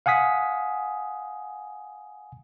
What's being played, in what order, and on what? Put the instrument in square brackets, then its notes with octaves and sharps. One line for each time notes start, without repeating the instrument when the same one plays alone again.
[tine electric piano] F5 F#5 G#5 D#6 B6